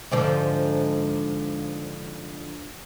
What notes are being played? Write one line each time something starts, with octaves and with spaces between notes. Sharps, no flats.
G#2 D3 F3